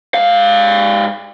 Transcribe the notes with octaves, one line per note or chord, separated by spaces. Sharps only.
G#2 F5